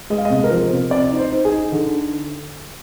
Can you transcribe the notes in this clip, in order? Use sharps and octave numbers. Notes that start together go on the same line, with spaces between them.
G#3 D#5
F5
D#5
C3
A#4
F3 C5
C3
C4 D5
D#4
C5
D#4
G#4
D#4
D3